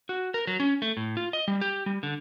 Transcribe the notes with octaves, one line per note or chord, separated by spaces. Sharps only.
F#4
A#4
F#3
C#4
A3
A2
F4
D#5
G3
G4
G3
D3